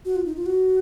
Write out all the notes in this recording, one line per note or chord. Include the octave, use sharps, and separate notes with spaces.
F#4
F4
D#4
F4
F#4